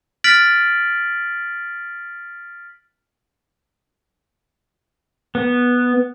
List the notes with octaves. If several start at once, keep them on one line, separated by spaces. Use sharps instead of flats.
F6 A6 B6 D7 F#7
B3